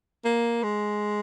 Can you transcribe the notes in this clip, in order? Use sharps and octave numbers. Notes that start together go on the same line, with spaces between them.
A#3
G#3